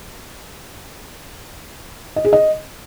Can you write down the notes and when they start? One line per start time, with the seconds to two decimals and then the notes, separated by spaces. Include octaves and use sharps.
2.16 D#5
2.25 G#4
2.33 D#5